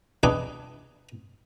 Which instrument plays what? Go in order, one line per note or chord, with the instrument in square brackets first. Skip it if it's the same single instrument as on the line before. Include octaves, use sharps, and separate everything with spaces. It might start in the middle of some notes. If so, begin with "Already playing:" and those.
[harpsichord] D4 D#4 G#4 B4 G5